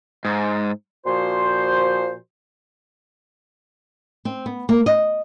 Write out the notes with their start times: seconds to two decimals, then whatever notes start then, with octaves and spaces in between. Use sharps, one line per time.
0.25 G#2
1.06 A#2 F3 F#4 C5
4.25 C4
4.46 B3
4.69 A#3
4.86 D#5